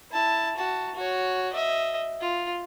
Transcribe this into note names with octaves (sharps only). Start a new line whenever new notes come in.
E4 A5
F#4 A5
F#4 C#5
D#5 E5
F4